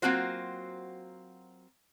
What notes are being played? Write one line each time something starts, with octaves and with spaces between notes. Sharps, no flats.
F#3 A#3 C4 F4 F#4 C5